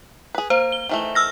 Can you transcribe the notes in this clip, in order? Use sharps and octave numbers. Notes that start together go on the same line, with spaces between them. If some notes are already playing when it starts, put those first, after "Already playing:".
G#4 B4
A#3 C5
G7
D#3 E3 A3
E6 F6 A#6